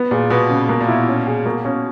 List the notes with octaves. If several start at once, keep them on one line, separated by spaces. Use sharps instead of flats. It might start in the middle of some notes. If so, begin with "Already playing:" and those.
Already playing: B3
A#2 G#4
B2 B3
C#3
B2 A#3
A#2
B2 E4
C#4
G#4
B2 A#3
B2 C#4